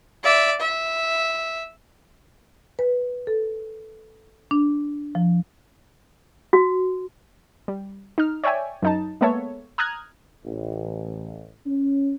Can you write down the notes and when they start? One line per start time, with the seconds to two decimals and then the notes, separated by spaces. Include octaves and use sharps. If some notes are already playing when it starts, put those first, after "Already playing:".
0.24 D5 E5
0.61 E5
2.79 B4
3.27 A4
4.51 D4
5.15 F3
6.53 F#4
7.68 G3
8.18 D#4 F6
8.44 C#5 D5 E5 G5 G#5
8.82 F#2 D#4 A5
9.21 G#3 A#3 B3 A4 C#5 E5
9.78 A#5 D#6 F6 F#6 G#6
10.45 A1
11.66 C#4